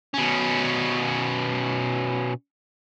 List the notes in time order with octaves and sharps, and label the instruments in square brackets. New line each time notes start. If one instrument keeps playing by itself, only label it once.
[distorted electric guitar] B2 C#4